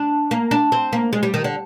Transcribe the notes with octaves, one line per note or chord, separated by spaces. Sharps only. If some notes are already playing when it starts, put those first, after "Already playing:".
Already playing: D4
A#3
D4
C4
A#3
G#3
G3
D#3
D3